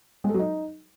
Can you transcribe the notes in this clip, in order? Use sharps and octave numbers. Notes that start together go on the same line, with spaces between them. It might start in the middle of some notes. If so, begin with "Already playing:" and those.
G#3
A4
F#3
D#4